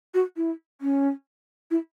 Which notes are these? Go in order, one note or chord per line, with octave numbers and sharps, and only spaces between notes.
F#4
E4
C#4
E4